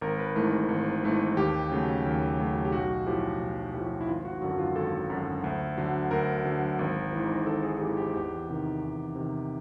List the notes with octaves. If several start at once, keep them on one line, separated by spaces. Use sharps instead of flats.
G#1 A#4
B4
G#2 E3 A3 A#4
G#1
G#2 E3 A3
D#2 G4
C#3 F#3 A3
D#2
C#3 F#3 A3
G4
B1 F#4
A2 F3 G4
B1
A2 F3 G4
E4
G#1 F4
F#4
F#2 D3 F#3 F#4
F4
G#1 A4
F#2 D3 F#3
D2
D3 F#3
D2 A#4
D3 F#3
G#1
G#2 E3
G#1 A4
G#4
G#2 E3 G4
G4
E2 G4
C3 D#3
E2
C3 D#3